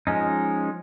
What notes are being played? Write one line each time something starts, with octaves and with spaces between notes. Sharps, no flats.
F3 G#3 C#4 D#4